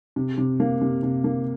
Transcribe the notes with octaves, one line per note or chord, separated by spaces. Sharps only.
C3
C3
A#3
C3
C3
A#3